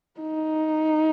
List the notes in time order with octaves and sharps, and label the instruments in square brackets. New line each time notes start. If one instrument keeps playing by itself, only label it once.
[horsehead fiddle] D#4